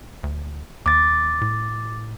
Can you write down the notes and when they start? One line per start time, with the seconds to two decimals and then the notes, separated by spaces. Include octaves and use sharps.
0.23 D2
0.86 D#2 D6 A6
1.41 A2